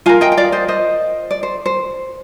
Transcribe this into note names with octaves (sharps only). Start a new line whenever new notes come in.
F4 A#4 F5 G#5
D#5 G5
G5
D5 F5
C5 D#5
C5 D#5
D5
C5
C5